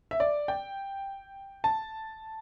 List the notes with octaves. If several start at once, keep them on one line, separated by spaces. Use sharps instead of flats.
E5
D5
G5
A5